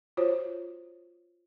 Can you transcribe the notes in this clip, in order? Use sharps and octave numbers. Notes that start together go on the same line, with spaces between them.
F4 F#4 C5 C#5